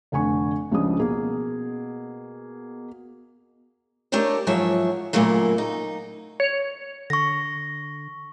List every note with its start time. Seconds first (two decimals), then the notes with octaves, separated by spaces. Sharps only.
0.12 F1 D3 G#5 C#6
0.71 C#2 C#3 F3 D4 D#6
0.99 B2 A#3 G#4
4.12 A3 D4 G4 A#4 C#5
4.47 G#2 F3 F#3 C#5 E5
5.13 A#2 C#3 F#3 A3 A#3
5.58 D#4
6.40 C#5
7.10 D3 C#6 A#6